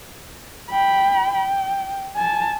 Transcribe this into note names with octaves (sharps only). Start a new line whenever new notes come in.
G5 B5
G5
G#5 A5